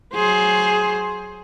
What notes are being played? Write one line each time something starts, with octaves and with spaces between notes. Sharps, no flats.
F#3 G#4 C5